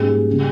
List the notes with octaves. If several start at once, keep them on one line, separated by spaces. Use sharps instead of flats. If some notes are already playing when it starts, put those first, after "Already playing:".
Already playing: G#2 G3 A#3 C#4 G#4
C#3 G3